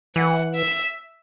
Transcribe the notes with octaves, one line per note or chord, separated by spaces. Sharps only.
E3 F#5
E5